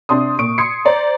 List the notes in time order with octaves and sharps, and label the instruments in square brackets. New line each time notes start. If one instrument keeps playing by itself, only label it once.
[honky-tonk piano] C3 D4 C6 D#6
A#2 C#6 D#6 D7
C6 D#6 G#6 C7 C#7
C5 D5 A#5